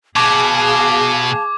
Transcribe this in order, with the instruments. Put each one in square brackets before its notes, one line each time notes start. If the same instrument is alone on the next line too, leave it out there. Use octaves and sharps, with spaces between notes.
[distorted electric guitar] B2 [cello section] G#4 F5 [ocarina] A5 [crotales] C#6 D6 G#6